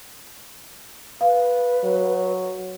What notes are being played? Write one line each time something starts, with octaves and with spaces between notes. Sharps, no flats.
B4 F5
F#3